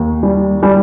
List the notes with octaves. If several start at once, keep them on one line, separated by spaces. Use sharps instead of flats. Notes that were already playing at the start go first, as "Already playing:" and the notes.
Already playing: D#2 D#3
G3
G3